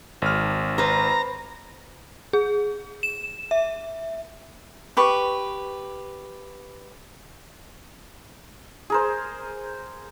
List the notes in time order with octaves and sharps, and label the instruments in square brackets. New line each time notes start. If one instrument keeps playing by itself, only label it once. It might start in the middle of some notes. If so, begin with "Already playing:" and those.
[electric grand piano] G#1 F6
[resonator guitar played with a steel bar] B4 C5 [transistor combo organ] A#5
[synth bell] G#4
E7
E5
[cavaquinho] G4 B4 C#6
[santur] G#4 A#4 C5